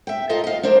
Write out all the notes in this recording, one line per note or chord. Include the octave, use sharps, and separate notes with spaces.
E5 G5
F4 A4 A#4 D#5 F5
D#5 F5
D4 A#4 C5